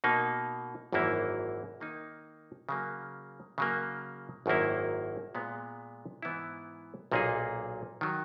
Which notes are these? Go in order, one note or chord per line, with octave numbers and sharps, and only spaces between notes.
B2 A#3 D#4
G#1 F#2 E3 A#3 E4
D#3 A#3 D#4
C#3 F#3 A#3
C#3 F#3 A#3
G#1 F#2 D#3 A#3 E4
A#2 G#3 B3
G#2 E3 B3 E4
B1 A#2 A#3 D#4 G#4
D#3 F#3